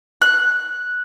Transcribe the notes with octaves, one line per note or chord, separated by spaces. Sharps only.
F#6